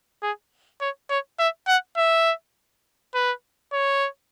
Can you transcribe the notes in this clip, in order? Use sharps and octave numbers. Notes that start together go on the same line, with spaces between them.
G#4
C#5
C#5
E5
F#5
E5
B4
C#5